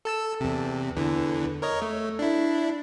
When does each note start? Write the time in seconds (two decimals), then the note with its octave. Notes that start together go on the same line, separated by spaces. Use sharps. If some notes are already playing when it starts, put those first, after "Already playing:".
0.05 A4 A5 E6
0.40 E2 C3
0.96 E2 D3 E3
1.62 A#4 C#5 D#5
1.82 A3
2.19 D4 E4